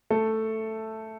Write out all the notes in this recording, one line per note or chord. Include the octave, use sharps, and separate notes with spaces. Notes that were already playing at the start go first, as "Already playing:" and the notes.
A3 A4